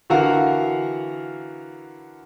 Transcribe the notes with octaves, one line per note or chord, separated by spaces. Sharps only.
D3 E3 F#4 A#4 F5 F#5